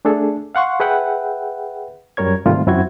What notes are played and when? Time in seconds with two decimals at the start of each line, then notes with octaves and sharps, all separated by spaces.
0.05 A3 D4 G#4 A4
0.55 F5 F#5 C6 C#6
0.80 G#4 B4 E5 F#5 G5
2.17 F#2 G3 A#4 C#5 G#6
2.46 G#2 C3 D#3 G3 A3 F4
2.66 F#2 C4 E4 F#4 G#6